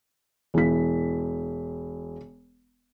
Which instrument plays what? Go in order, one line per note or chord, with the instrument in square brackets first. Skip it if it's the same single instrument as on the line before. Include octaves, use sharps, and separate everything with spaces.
[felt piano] E1 E3 B6